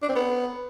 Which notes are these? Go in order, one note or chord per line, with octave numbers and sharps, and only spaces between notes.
D4
C4
B3